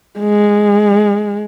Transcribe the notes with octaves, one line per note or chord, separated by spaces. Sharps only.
G#3